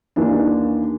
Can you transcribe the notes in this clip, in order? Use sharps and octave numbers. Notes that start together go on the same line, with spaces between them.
D#2 D#3 E3 A#3 D4